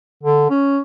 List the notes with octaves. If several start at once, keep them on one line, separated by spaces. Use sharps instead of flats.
D3
C#4